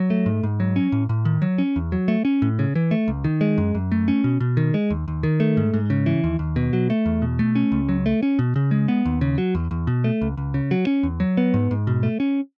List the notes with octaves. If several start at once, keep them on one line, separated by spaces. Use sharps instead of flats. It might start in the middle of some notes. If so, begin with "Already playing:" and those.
Already playing: F#3
A3
G#2
G#2
F#3
C#4
A2
A2
D#3
F#3
C#4
E2
F#3
A3
C#4
A2
C#3
E3
A3
C#2
D#3
G#3
F#2
F#2
A3
C#4
B2
B2
D#3
G#3
D#2
D#2
D#3
A3
G#2
G#2
C#3
E3
D#2
D#2
B2
F#3
A3
E2
B2
A3
C#4
C#2
F#3
A3
C#4
B2
C#3
G#3
B3
D#2
C#3
F#3
E2
E2
B2
A3
C#2
C#2
C#3
F#3
C#4
E2
F#3
B3
G#2
G#2
B2
A3
C#4